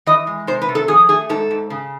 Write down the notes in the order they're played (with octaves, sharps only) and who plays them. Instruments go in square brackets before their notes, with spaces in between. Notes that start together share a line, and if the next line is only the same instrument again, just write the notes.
[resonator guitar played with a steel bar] E3 D#5
G#3
C3 C5
B4
C3
A4
F3 G#4
A3 G#4
G#2 A4
G#2
C#3